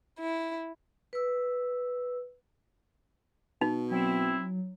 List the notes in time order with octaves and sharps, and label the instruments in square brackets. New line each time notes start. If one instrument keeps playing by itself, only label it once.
[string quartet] E4
[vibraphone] B4 E6
[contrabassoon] B2 [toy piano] D#4
[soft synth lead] F#3 [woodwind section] C4 E4